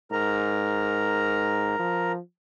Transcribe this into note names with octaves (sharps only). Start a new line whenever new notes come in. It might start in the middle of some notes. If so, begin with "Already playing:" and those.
G#2 A#4 A#5
F3